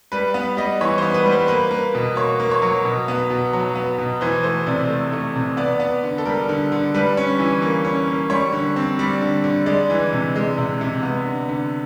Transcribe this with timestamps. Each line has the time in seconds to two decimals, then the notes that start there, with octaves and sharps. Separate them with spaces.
0.12 G3 B4
0.34 B3
0.57 G3 D#5
0.81 E3 C#5
0.98 B3 C5
1.14 B4
1.26 G3
1.32 C5
1.48 A#3 B4
1.71 A#3
1.95 B2
2.16 A#3 C#5
2.40 A#3
2.51 C#5
2.62 F#3
2.85 B2
3.08 B3
3.30 B2
3.53 F#3
3.76 B3
3.98 B2
4.21 E3 C5
4.43 A3 C5
4.67 C3 D5
4.89 A3
5.12 A3
5.36 C3
5.57 B3 D5
5.80 B3
6.03 D3
6.18 A4
6.25 G3 A#4
6.49 D3
6.72 D3
6.94 G3 B4
7.17 C#4
7.39 E3
7.62 A#3
7.85 C#4
8.07 A#3
8.30 G3 C#5
8.53 D3
8.76 C4
8.99 G3 D5
9.21 D3
9.44 D3
9.66 G#3 D5
9.90 E3
10.13 C3
10.36 G#3
10.58 C3
10.81 C3
11.03 B3
11.25 D3
11.49 D3